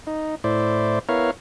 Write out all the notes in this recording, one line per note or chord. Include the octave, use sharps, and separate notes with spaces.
D#4
A2 E4 C5 D5
B3 E4 A#4 C#5 F5